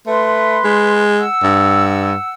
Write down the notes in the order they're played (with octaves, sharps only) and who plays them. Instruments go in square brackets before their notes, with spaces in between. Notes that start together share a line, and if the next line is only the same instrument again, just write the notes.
[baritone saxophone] A3 [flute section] B4 C6
[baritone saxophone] G#3
[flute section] F#5 E6
[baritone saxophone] G2